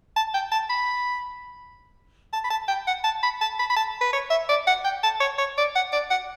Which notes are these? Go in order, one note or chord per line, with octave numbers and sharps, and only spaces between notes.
A5
G5
A5
B5
A5
B5
A5
G5
F#5
A5
B5
A5
B5
B5
A5
B4
C#5
E5
D5
F#5
G5
A5
C#5
C#5
D5
F#5
D5
F#5